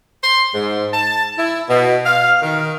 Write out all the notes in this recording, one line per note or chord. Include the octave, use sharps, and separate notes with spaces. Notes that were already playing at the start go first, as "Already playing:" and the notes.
C6
G#2
A5
E4
B2
F5
D#3